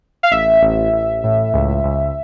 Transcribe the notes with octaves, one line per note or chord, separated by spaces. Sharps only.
F5
A1 E5
A1
A1
A2
C#2
C#2